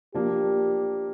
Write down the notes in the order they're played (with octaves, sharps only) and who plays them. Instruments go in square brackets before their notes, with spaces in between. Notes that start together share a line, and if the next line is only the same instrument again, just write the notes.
[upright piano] F3 A#3 D4 [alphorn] G4